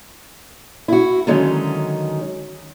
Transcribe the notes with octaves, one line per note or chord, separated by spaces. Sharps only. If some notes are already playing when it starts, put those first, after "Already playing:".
E4 F#4
D3 D#3 F#3 G#3 C#4